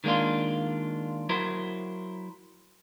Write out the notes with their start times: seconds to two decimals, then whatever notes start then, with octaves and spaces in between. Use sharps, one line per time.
0.04 D#3 G#3 A#3 D4 F4
1.29 F#3 E4 A#4 C5